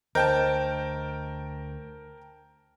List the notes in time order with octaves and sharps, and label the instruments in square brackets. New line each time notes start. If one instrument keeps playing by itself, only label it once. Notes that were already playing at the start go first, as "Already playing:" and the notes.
[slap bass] D2 [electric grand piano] A#4 G5 A5 [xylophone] C5 D#5 G6